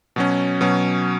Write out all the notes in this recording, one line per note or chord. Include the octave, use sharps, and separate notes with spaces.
B2 F#3 C#4
B2 F#3 C#4